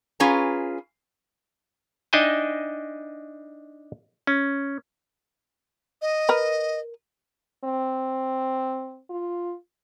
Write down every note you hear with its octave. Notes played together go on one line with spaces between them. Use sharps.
C#4 F4 G#4 B4 A#5
D4 D#4 D#5 E5 G5 G#5
C#4
D#5
A#4 B4
C4
F4